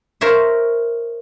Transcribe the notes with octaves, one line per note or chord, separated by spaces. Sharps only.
A#4 C5 C#5 E5